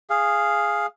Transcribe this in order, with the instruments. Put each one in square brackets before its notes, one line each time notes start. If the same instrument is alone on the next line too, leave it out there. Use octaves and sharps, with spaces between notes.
[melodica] G#4 F5